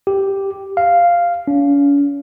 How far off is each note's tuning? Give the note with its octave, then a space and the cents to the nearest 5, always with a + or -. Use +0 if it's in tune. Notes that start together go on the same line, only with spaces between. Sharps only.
G4 +0
F5 -5
C#4 +40